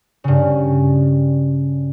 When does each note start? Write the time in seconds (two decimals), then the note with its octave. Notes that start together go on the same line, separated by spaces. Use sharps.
0.24 G2 C#3